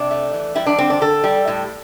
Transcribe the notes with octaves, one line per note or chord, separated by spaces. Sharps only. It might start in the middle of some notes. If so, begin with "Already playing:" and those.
Already playing: C3 D4
A3
E3
G3 E4
D4
D3 C4
D4
D3 A4
G3
A2